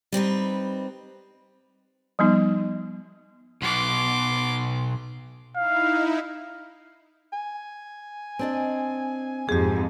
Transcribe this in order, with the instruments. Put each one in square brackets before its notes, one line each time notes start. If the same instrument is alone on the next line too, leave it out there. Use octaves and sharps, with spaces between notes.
[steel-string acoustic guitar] G3 C4 D#4 B4
[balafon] F3 G3 B3 D#4
[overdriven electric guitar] B1 B2 [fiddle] C6 D6
[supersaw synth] D#4 E4 [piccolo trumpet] F5
[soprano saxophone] G#5
[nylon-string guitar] C4 D4 D#5
[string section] F2 G#2 [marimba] G4 G#4